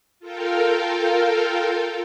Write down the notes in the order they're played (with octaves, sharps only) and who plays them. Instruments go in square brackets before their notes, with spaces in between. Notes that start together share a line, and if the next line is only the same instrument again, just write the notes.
[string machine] F4 A4 A#4 F5 G5